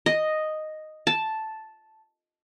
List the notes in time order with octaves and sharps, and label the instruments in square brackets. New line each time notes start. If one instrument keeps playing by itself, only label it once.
[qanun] D#5
A5